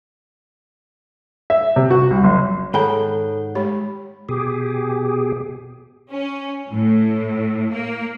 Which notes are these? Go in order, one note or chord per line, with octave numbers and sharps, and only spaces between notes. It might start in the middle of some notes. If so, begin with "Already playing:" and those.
E5
C3
F#4
C2
F#1
G#2 D#3 G#4 A4 C#5 F#5 G5 B5
G#3 G4 C#5 B5
B2 G4 G#4
C#4
A2
A#3